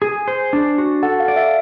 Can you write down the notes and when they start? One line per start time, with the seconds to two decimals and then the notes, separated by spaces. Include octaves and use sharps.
0.02 G#4 G#5
0.28 C5
0.53 D4
0.78 F#4
1.03 A4 F#5
1.20 F5
1.28 D5
1.36 E5